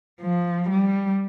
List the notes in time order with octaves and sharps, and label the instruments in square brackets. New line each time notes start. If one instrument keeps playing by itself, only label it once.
[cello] F3
G3